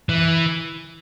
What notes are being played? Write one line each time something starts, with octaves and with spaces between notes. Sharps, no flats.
E3